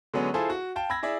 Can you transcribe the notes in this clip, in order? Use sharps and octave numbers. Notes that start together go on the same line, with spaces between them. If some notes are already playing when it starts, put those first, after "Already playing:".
D3 F#3 G#3 B3 C#4
E4 F4 G#4 A4 C5
F#4
F5 G5 A5
B5 E6 G#6 A#6
E4 G#4 D5 E5